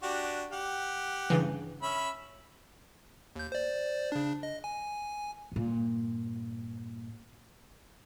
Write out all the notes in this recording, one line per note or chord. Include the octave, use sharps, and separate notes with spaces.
D4 F#4 G4
G4 F#5
G2 C#3 E3
C#4 E5 B5
D#2 G6
C5 D5
C#3 D4
D#5
G#5
G2 A#2